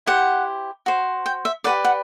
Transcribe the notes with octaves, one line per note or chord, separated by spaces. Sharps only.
E4 G4 C5 F#5
F#4 C5
G5
E5
G4 B4 D5 F#5
F#5